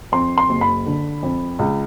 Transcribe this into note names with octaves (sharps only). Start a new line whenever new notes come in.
F2 C6
C6
F#1
B5
D3
F2
C#2